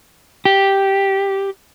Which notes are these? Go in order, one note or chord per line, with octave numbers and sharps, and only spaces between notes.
G4